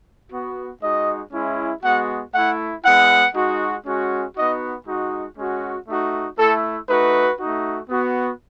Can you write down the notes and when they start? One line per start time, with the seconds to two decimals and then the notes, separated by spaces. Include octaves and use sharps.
0.30 B3 F#4
0.81 G#3 D#4 F#4 D#5
1.32 G#3 C#4 E4
1.82 G#3 B3 F#4 F#5
2.33 A3 E4 F#5
2.83 G#3 B3 E4 F#5
3.34 G#3 D#4 F#4
3.85 G#3 C#4 F#4
4.35 B3 D#4 F#4 D#5
4.86 G#3 D#4 F#4
5.37 G#3 C#4 F#4
5.87 A3 D#4 F#4
6.38 A3 E4 A4
6.88 A3 D#4 F#4 B4
7.38 A3 D#4 F#4
7.89 B3 F#4